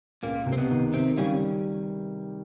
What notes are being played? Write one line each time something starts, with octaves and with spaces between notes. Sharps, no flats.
C#2 A#2 A#3
C3
C4
B2 B3
D#3
C3 D#3 C4
C#3 G3 C#4